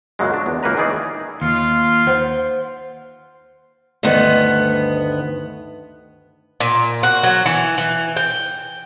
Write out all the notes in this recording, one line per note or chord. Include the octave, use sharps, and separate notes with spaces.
F#2 A#2 C#3 F#3 G#3
D4
E2
C#2 A#3 F#4 B4 A#5
D#3 E3 D#4 G#4 D5
D#2 F4
C5 F#5
D2 G2 D#3 B3
A#2
F#4
F#3
E3
E3
G5